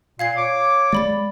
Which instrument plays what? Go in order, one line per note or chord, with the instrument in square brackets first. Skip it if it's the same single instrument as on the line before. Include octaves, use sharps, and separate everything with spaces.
[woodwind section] A#2 [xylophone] F5 G#6 C7
[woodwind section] C#5 D6
[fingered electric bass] G#3 [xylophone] D5 B5 A6